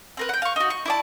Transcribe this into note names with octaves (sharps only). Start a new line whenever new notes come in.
C4 A#4 B4
F#5 G5
F5 C#6
D#4 F#4
C#6
E4 D5 A5